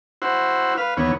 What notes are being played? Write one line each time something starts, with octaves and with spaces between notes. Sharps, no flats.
E4 F#4 C5
B4 F5
D#2 E3 B3 C#5